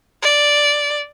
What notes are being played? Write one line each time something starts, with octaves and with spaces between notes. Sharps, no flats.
D5